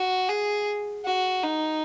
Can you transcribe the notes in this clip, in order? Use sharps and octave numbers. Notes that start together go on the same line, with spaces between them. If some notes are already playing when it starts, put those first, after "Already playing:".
Already playing: F#4
G#4
F#4
D#4